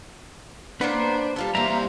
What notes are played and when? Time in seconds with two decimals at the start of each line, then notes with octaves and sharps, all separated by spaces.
0.81 A#3 B3 D4 B4 C5 F#5
1.36 G3 F4 A4
1.55 E3 G3 A#3 C5 E5 F5 A#5